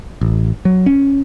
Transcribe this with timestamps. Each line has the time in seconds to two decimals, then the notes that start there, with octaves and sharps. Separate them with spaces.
0.21 A1
0.65 F#3
0.86 C#4